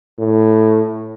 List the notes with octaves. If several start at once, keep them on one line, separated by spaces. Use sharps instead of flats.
A2